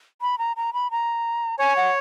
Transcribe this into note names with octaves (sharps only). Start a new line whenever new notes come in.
B5
A#5
A#5
B5
A#5
C#5 G#5
F#5